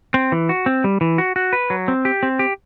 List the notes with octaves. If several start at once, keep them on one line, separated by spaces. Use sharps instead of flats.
C4
E3
F#4
C4
G3
E3
F#4
F#4
B4
F#3
C4
G4
C4
G4